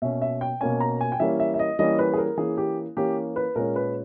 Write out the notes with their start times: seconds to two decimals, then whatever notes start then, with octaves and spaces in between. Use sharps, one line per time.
0.02 B2 A#3 C#4 E5
0.22 E5
0.41 G5
0.61 B2 A#3 C#4 G#5
0.80 A#5
1.01 G#5
1.12 G5
1.20 E3 G3 A#3 C#4 E5
1.40 E5
1.54 E5
1.59 D#5
1.79 E3 G3 A#3 C#4 D#5
1.99 B4
2.14 G#4
2.18 A#4
2.38 E3 A#3 C#4 G#4
2.58 G4
2.97 E3 A#3 C#4 G4
3.36 B4
3.56 A#2 G#3 C#4 A#4
3.76 B4